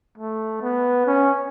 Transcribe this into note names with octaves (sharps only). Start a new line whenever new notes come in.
A3
B3
C#4